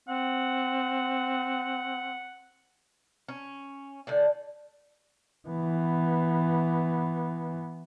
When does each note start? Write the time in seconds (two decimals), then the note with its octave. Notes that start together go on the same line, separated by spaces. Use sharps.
0.08 C4 F#5
3.28 C#4
4.07 A2 D3 D5
5.48 E3 B3